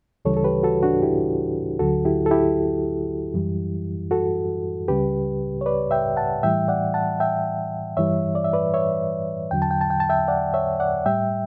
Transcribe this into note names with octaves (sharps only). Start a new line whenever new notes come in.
D2 C#3 E3 G3 A4 C#5
A4
G4 B4
F#4 A4
D4 F#4
E4 G4
D2 D3 F#3 F#4 A4
E4 G4
A4
E4 G4
F#2 E3 G3
F#4 A4
C#2 C#3 G3 G4 B4
C#5
B4 D5
E5 G5
F#5 A5
A2 E3 G3 E5 G5
D5 F#5
F#5 A5
E5 G5
G2 E3 G3 C#5 E5
D5
E5
B4 D5
C#5 E5
E2 D3 F#3 G5
A5
G5
A5
G5
A5
E5 G5
D5 F#5
C#5 E5
D5 F#5
A2 G3 E5 G5